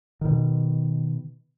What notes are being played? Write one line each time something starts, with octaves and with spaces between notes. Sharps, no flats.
B2 D#3